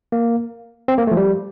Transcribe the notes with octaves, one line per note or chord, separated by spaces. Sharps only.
A#3
C4
A#3
A3
F3
G3